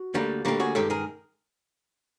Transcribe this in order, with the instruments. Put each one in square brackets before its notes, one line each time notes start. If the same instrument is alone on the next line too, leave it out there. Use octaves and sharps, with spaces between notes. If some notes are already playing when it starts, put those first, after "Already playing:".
Already playing: [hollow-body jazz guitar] F#4
D2 D3 G3 A#3
D2 D3 G3 A#3 G4
F#4 G#4
G2 D#3 G#3 G4 A4
G#4 A#4